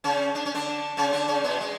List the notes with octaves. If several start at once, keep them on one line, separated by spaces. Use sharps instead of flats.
C#3 C#4
D4
C#4
D3 D4
C#3 C#4
D3 D4
C#3 C#4
B2 B3
G#3